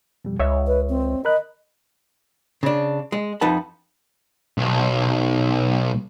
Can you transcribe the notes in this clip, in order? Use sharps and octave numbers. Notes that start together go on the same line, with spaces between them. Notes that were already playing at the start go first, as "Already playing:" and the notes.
F2 B2 G3
C#2 C#5 D#5 E5
B4
C4
A#4 D#5 B5 F#6
C#3 D4
G#3
F2 F3 D#4 B4 F#5 A5
B1